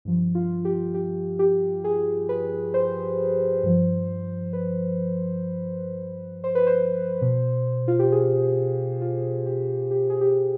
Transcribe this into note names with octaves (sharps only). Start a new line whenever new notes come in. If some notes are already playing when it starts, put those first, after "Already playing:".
G2 F3
F4
G4
G4
G4
G#4
B4
C5
G2 F3
B4
C5
B4
C5
B2
F4
G4
G#4
F4
G4
G4
G#4
G4